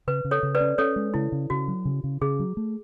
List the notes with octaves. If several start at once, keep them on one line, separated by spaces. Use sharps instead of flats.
C#3 B4
C#3
A4 C#5
C#3
B4 D5
C#4
C#4 A4 C#5
G#3
C#3 E4
C#3
C#3 F#4
F#3
C#3
C#3
C#3 G#4
F#3
A3